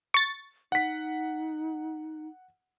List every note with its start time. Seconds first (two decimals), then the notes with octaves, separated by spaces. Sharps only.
0.14 C#6 A6
0.72 D#4 F#5 B6